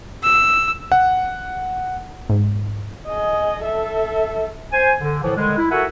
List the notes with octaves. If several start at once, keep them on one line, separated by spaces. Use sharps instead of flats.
E6
F#5
G#2
G#4 D#5
A4 E5
C5 G#5
D3
A2 D3 E3 F3
D3 D#3 G3 G#3
E4
F#4 A4 A#4 E5 F#5 G#5